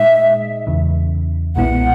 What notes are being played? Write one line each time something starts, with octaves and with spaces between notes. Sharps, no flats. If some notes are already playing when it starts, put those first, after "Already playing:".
Already playing: A#2 G#3 D#4 G#4 D#5 E5
E2 C#3 E3
B1 A#2 G#3 B3 E4 F#5